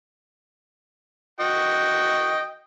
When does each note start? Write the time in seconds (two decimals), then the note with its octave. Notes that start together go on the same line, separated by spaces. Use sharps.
1.40 F#4 D#5 G5